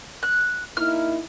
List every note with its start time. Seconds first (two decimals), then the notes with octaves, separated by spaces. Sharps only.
0.23 F#6
0.77 A#3 D#4 E4 F6